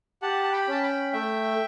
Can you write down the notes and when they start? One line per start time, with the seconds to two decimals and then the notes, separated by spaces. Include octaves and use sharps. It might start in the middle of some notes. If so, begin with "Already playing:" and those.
0.22 G4 F#5 A5
0.44 A5
0.52 G5 B5
0.68 C#4 A5
0.83 G5 B5
1.13 A3 E5 G5